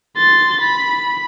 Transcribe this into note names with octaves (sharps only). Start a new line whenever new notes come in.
C6 A6
B5